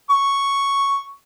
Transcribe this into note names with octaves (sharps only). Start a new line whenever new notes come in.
C#6